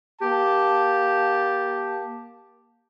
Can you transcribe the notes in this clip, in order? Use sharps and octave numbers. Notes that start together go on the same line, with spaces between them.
A#3 G4 A5